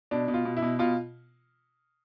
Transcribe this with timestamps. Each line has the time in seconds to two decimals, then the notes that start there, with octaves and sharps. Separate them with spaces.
0.11 B2 D4
0.28 B2
0.34 F4
0.45 B2
0.57 E4
0.62 B2
0.79 B2 F4